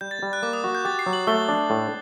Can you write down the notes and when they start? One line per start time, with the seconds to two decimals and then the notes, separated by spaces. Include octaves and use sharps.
0.01 G3 G6
0.11 A6
0.22 G3
0.33 F#6
0.43 A#3 D6
0.53 D#6
0.64 F#4
0.75 G6
0.85 G4 A6
0.99 C7
1.06 F#3
1.13 F#7
1.27 A3 G7
1.49 D4
1.70 A2